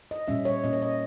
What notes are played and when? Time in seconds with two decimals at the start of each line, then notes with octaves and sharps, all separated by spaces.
0.11 D#5
0.28 A#2 G3 C#4 E5
0.45 C#5
0.64 A#2 A#3 C#4 D#5
0.73 C#5
0.82 D#5